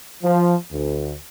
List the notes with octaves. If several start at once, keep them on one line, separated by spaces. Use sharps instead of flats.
F3
D2